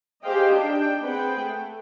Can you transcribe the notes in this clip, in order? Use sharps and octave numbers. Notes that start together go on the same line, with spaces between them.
G4 G#4 C5 D#5 F5 G5
D4 D#4 G4 G5
C4 G#4 B4 F#5 G5
A3